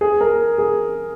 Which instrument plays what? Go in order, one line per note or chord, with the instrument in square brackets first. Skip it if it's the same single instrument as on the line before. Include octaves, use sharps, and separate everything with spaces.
[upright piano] G#4
A#4
G#4